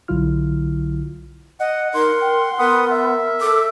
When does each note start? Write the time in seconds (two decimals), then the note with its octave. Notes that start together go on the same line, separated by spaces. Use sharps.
0.08 B1 D3 F#3 E4 F4 F6
1.60 D#5 F#5
1.94 D#4 A#4 C6
2.21 G5
2.59 B3 A#4 B4 F#5 D#6
2.91 E5
3.41 A4 D6